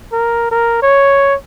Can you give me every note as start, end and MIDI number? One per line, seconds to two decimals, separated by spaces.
0.12 0.49 70
0.51 0.82 70
0.82 1.35 73